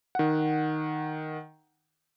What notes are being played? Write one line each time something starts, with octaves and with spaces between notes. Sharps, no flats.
D#3 F#5